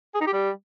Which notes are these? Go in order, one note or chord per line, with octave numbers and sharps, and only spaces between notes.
G#4
D#4
G4
G3